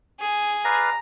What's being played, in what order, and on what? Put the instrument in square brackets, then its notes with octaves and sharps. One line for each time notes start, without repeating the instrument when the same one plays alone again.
[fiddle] G#4
[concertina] B4 D5 F5 [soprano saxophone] A#5